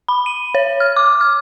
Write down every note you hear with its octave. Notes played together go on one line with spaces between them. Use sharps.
B5
D#7
C#5
F6
D6
F6